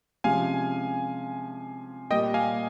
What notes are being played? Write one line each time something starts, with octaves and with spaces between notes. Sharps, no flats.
C3 F3 G#3 C#4 F5 G#5
A#2 G3 A#3 D#5 G5
F5 G#5